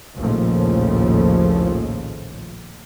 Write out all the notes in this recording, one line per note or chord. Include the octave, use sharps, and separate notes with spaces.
A#1 D#2 A2 C#3 F3 A3